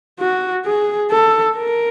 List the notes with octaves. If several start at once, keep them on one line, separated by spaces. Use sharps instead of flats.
F#4
G#4
A4
A#4